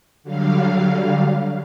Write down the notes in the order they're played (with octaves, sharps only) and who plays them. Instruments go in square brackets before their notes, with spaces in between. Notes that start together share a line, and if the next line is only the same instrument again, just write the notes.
[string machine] D3 F#3 G3 F5